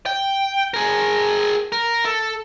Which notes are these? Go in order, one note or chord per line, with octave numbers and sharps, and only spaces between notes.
G5
G#4 A#4
A#4
A4